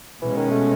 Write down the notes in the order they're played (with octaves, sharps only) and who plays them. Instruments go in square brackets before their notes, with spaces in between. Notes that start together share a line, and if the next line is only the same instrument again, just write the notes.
[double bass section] B2 G#3 C#4 [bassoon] E3
[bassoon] D#3
A3